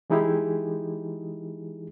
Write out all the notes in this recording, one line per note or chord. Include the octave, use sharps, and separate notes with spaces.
E3 G#3 D#4 E4 G4 G#4